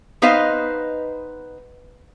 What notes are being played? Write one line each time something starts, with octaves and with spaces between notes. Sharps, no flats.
B3 D#4 B4 C5 D#5 F5